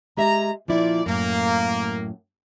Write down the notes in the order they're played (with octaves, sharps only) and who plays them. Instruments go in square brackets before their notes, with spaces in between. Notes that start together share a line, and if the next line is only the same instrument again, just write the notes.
[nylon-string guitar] G#3 G4 E5 [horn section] A#5
[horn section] A#2 D5 [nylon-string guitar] F3 E4
[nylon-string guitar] F#2 A2 [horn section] A#3